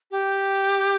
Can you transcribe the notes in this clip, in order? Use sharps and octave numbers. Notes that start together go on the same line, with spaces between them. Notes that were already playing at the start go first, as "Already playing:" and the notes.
G4